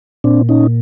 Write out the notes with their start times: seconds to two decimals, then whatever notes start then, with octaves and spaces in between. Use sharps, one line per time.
0.24 A#2 C4 D4
0.49 C#4 D#4